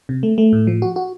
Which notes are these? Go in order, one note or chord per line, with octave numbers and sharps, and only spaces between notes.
C3
A3
A3
A2
F3
F#4
F#4